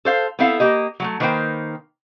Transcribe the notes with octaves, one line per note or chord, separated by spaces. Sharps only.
A4 C5 F5
B3 C4 E4 A4 F5
A#3 G4 D#5
F#3 G#3 A3
D#3 A#3 B4 C5 G5